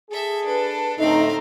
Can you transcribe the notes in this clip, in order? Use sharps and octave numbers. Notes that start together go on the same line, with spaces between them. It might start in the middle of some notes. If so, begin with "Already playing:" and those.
G#4 A4 E5
D4 A4 B4
A2 D3 A3 C4 D#4 E5 F5 A#5